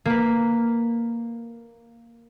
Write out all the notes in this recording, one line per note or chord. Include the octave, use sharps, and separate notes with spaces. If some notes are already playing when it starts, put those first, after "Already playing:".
A#3 B4